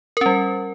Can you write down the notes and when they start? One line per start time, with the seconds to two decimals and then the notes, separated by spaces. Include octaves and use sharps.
0.17 A#4
0.21 C#4
0.26 G3